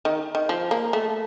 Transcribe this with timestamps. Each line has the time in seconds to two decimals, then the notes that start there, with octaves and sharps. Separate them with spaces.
0.05 D#3
0.35 D#3
0.49 F3
0.71 A#3
0.93 A3